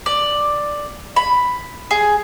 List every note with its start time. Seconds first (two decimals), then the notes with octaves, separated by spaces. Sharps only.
0.06 D5
1.16 B5
1.91 G#4